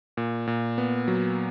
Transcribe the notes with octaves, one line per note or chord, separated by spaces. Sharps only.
A#2
A#2
B3
F#3